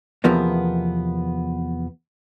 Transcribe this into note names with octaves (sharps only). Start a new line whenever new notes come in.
E2 C3 F3 A#3 B3